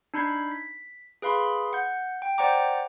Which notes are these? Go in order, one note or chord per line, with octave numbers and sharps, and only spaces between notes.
D4 D#4 B5 G6 G#6 C7
B6
G#4 B4 F5 B5 C6
F#5 G6
G5
C5 D5 F#5 G5 A#5 D6